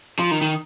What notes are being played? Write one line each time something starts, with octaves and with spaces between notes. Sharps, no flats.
F3
D#3
D#3